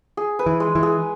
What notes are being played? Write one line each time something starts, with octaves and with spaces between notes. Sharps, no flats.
G#4
B4
E3
G#3
E3
G#4